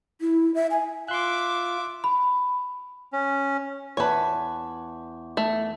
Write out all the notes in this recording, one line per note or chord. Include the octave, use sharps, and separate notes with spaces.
E4
E5
G#5
F4 E5 C6 D6 F#6
B5
C#4
E2 B4 C#5 A5
A3